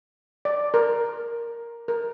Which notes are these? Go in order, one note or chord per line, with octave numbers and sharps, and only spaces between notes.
D5
A#4
A#4